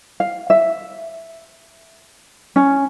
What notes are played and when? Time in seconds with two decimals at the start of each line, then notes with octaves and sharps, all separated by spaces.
0.20 F5
0.50 E5
2.56 C#4